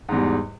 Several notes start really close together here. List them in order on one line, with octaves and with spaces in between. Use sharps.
G#2 E2 G3